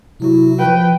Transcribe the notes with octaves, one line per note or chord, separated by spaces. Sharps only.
C3 F#3 E4 F#4
F3 B4 G5